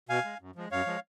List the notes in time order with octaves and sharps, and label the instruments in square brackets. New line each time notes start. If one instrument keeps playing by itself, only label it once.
[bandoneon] B2 F5 G#5
G#3
F#2
F3 G#3
F#2 C#5 F5
F3 G#3